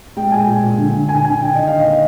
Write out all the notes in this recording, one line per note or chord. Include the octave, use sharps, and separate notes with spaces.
G#3 G5
A#2 G#5
A#2
A#2
D3
D3
D3 G#5
D3 G#5
D4 G5
D#3 D#5
D#3 F5
D#5
A#3